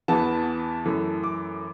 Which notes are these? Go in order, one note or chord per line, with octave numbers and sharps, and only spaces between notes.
E2 E3 B3 A5
F#2 E3 A3
D6